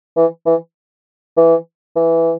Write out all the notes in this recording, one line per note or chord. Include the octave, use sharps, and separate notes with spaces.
E3
E3
E3
E3